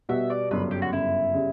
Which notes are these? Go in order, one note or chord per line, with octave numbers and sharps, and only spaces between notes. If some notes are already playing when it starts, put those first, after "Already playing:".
B2 G3 B3 F#4 E5
D5
G1 F#2 C#3 B4
G4
F#4
G1 F#2 C#3 E4
C#3 G3